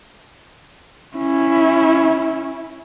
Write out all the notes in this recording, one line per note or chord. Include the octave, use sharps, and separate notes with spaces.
C#4 E4